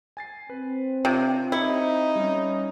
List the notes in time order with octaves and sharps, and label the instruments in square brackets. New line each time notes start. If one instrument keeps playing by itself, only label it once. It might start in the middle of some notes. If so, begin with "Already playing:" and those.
[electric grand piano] G#5 A6 C7
[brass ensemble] C4 [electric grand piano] B4
[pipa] C3 [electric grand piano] D4 F4
[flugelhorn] D#4 [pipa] E4 [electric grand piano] G4 C#7
[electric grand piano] G3 C#4